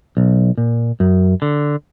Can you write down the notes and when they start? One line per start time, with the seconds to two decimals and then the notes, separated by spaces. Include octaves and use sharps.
0.17 B1
0.58 A#2
1.00 F#2
1.42 D3